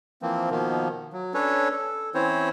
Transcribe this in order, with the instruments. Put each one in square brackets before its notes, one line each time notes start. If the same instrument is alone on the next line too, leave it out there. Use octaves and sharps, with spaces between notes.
[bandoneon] E3 F3 A#3 C4
B2 D#3 F3 A#3 B3
F#3
C#4 D4 A4 B4 C#5
A4
E3 C4 C#4 E4 C5 C#5